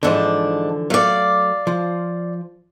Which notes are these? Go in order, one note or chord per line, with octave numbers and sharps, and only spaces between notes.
G#2 D3 E3 F3 D4
F#3 A3 D5 F5
F3